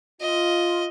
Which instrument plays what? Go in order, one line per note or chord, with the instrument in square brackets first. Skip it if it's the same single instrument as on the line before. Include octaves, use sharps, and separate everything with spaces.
[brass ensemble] F4 [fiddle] D#5